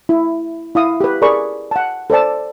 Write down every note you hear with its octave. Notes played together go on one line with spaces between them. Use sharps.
E4
E4 F5 D#6
G4 B4
G#4 A#4 D5 B5 C#6
F#5 A5
A4 C5 D5 A5